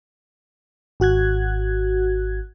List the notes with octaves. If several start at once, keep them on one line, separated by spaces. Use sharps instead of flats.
G#1 F#4 F#6 G#6